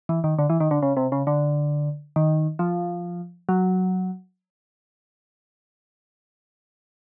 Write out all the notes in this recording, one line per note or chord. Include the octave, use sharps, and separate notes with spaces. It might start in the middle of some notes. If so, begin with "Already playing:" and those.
E3
D#3
D3
E3
D#3
D3
C#3
C3
C#3
D3
D#3
F3
F#3